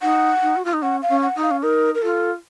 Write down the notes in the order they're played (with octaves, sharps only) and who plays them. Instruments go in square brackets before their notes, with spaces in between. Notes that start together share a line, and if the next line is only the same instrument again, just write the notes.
[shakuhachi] D#4 [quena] F#5
[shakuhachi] D#4
F#4
F4
D#4
[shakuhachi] C#4 [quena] F#5
[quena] F5
[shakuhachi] C#4
[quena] F#5
[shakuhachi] D#4
[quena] F5
[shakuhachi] C#4
[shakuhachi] D#4 [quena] A#4
[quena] A#4
[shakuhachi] F4 [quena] A4